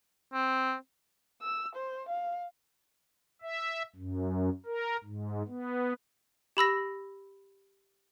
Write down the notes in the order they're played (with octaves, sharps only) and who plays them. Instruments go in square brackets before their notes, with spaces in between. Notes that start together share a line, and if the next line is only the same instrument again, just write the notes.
[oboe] C4
[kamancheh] E6
C5
F5
[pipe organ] E5
F#2
A#4
G#2
B3
[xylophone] G4 B5 E6 A#6